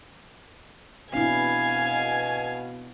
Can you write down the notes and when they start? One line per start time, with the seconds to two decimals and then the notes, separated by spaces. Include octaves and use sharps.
1.13 B2 C4 D4 E4 F5 G#5